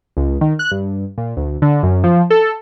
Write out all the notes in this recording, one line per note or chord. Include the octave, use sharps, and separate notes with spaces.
C#2
D#3
F#6
G2
A#2
D2
D3
F#2
F3
A4